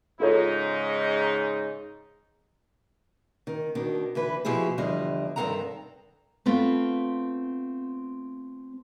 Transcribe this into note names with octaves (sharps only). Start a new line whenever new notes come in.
G#2 C#3 D#4 F4 A4 C#5
D#3
B2 D#3 D4
D3 E3 B4
B2 F3 E4 G4 G#4
E2 D3 F3 G3 D#5
G2 D#3 C4 A4 F#5 A#5
A3 B3 C4 F4